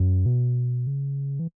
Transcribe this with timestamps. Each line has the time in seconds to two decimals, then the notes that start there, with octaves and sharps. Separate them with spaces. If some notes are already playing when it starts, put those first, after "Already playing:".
Already playing: F#2
0.26 B2
0.87 C#3
1.39 E3